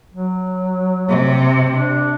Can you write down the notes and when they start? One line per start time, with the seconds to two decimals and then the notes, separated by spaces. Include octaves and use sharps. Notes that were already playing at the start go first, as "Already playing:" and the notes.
0.14 F#3
1.09 C3
1.73 D4